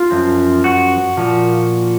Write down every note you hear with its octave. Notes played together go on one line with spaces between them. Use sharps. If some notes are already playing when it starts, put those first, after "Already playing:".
Already playing: F4
F#2 F3 C4
F#4
A#2 F3 A#3